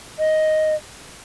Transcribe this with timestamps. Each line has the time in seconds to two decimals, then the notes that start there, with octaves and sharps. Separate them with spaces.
0.19 D#5